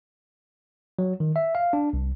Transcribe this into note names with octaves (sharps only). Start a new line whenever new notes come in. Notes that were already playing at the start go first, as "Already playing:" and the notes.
F#3
D#3
E5
F5
D4
C2